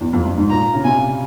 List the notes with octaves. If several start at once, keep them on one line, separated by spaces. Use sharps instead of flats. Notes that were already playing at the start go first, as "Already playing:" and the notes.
E2
F2
G2
G#2
A#2 A#5
C#3
C3 G#5